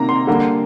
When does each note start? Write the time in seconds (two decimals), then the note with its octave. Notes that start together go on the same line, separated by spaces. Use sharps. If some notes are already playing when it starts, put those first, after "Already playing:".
Already playing: C3 D#3 A#3 A#5
0.09 C6
0.27 D3 G3 A#3